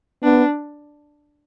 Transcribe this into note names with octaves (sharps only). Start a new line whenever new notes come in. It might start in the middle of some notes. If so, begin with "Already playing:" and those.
B3 D4